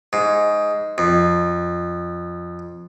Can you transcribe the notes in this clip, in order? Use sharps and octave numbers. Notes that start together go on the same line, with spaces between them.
G#2
F2